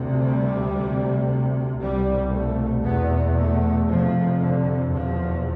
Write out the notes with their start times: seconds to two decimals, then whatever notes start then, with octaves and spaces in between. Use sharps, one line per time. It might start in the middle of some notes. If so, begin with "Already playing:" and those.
Already playing: D2 C3
0.21 G3
0.74 D2 C3
1.79 C2 B2 G3
2.30 A3
2.83 E2 B2 B3
3.35 A3
3.88 F2 C3 F3
4.40 D3
4.92 E2 B2 F3